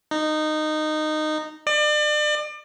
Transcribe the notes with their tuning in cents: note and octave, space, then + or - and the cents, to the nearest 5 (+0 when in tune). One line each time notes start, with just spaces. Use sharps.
D#4 -15
D5 +35